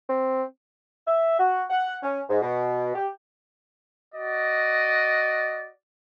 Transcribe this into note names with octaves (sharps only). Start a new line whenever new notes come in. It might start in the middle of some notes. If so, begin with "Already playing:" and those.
C4
E5
F#4
F#5
C#4
G#2
B2
G4
F#4 D5 D#5